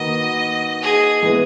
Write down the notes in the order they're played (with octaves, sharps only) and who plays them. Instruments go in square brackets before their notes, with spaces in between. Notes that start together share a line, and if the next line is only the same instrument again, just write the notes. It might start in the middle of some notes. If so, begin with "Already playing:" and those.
Already playing: [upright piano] D#3 A#3 D#4 F#4 B4 [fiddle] D#5
[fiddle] G#4
[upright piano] E3 G#3 B3